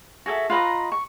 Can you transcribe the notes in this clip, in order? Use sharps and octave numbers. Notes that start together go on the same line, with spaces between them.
F#4 G#4 A4 E5
F4 B4 D#5 A#5
C#6